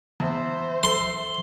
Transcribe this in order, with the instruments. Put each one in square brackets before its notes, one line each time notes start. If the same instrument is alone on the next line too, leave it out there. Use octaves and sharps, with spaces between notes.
[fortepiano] E2 [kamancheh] C5 E5
[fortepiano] A4 [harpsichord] C6 [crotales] G7